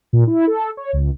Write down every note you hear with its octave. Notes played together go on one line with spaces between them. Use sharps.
A#2
E4
A4
C#5
C#2